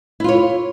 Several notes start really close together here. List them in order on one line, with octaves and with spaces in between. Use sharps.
E4 F4 C#5